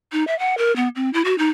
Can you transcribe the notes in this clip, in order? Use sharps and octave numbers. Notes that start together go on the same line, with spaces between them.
D#4
E5
F#5
A#4
B3
C4
E4
F#4
D#4